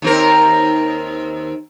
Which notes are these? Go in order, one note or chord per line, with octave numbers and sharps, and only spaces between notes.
D#2 C4 A#4